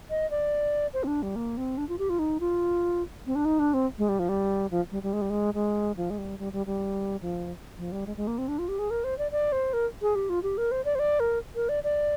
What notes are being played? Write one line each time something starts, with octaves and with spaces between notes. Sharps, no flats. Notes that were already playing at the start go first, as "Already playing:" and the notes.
D#5
D5
C5
C4
D4
G3
A#3
C4
D4
F4
G4
F4
D#4
F4
C4
D4
D#4
D4
C4
G#3
G3
F3
G3
F3
G3
G3
G#3
G3
G#3
G#3
F3
G#3
G3
G3
G3
G3
F3
F3
G3
G#3
G#3
A#3
C4
D4
F4
G4
G#4
A#4
C5
D5
D5
C5
A#4
G#4
G4
F4
G4
A#4
C5
D5
C5
D5
A#4
A#4
D5
D5